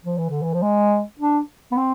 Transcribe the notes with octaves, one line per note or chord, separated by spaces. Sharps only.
F3
E3
D3
E3
F3
G#3
D4
B3
C4